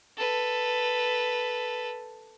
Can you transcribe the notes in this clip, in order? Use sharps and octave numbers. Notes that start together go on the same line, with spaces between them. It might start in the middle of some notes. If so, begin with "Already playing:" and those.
A4 B4